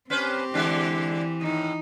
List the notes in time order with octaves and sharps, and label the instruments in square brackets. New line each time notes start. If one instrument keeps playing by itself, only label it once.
[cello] C4 G4 [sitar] C#4 B4 C5
[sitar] D3 G#3 D4 [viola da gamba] E3
[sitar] D#2 A2 [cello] D#4